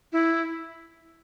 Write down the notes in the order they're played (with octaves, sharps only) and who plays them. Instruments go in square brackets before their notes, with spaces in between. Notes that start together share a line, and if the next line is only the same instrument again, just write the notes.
[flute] E4